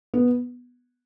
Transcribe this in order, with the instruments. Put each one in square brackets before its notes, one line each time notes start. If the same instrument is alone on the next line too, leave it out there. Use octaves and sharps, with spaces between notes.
[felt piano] B3